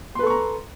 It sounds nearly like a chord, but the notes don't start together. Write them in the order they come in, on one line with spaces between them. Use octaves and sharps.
C6 B4 A4 C#6 A#5